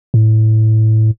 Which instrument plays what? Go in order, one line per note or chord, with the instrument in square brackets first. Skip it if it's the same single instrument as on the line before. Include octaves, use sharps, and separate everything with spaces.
[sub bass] A2